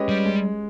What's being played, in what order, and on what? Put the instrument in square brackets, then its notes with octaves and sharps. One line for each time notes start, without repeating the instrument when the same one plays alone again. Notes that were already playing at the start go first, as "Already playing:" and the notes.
Already playing: [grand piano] G#3 C#4 G4 B4 D#5
[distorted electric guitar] G3
[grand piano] G#3